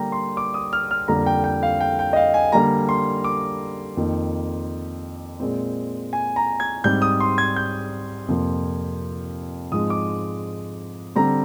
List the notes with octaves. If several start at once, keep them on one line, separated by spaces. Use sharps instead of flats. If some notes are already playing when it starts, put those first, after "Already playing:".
Already playing: D3 G3 A#3 G5 A#5
C6
D6
D#6
F6
F6
F2 D3 G3 A#3 A#5
G5
G5
F5
G5
G5
D#5
F5
G#5
D3 G3 A#3 A#5
C6
D6
F2 D#3 A#3
A#2 G#3 C4
G#5
A#5
G#6
G#2 G3 C4 G6
D#6
C6
G#6
G6
F2 C3 F3 A#3
G#2 F3 G#3 C4 D#6
D6
D3 G3 C4 A#5